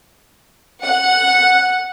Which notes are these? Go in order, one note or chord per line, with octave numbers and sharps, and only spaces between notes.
F#5